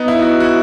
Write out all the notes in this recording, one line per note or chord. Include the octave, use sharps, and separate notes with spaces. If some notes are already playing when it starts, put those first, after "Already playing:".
Already playing: B3 D#4
E4
F#4
F#4
E4